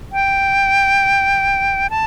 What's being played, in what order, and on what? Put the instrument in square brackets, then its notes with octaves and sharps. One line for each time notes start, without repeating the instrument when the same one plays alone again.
[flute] G5
A5